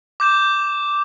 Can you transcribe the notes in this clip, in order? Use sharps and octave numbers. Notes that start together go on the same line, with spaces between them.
D6 G6 E7